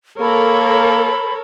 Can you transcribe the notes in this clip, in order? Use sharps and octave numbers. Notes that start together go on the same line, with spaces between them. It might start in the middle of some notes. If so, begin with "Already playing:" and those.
A#3 A4 A#4 C#5 B5